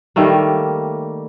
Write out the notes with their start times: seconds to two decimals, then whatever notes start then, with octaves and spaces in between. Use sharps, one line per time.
0.16 D#3 G3 A3 A#3